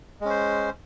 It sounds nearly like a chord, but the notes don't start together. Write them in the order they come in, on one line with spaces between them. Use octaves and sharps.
G#3 C#4 C5